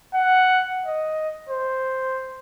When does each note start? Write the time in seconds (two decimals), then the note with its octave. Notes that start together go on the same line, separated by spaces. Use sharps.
0.15 F#5
0.86 D#5
1.49 C5